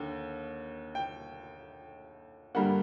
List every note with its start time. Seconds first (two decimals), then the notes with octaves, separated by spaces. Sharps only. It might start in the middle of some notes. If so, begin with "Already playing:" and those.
Already playing: D#2 D3
0.95 G5
2.55 G2 D3 G3 A#3 F#5